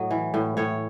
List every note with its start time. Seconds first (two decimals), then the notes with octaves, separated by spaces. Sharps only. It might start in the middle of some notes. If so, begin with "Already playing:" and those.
Already playing: A2 F#3 D#5
0.11 E3
0.34 A2
0.57 A2 C#5